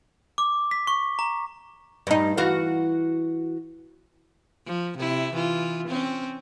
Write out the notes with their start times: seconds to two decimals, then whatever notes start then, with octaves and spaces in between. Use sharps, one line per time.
0.38 D6
0.71 B6
0.87 C#6
1.19 A#5
2.07 G2 D#4
2.37 E3 F#4 F5
4.66 F3
4.98 C3 E4
5.34 E3 F4
5.88 C4 C#4